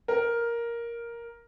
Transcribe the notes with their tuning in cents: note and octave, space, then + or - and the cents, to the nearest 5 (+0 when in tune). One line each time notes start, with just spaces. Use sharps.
A#4 +5